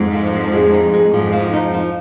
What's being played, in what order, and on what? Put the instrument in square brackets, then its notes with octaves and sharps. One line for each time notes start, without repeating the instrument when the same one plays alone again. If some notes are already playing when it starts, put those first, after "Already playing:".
Already playing: [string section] F2 G#2
[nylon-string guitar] F3
F3
G#3
D#4
G#3
[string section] F2 G#2 [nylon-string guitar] F3
[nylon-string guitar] F3
D#4
F3